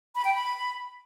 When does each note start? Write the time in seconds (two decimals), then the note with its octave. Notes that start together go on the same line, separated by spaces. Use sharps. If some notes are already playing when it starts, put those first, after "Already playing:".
0.15 B5
0.25 G5
0.34 B5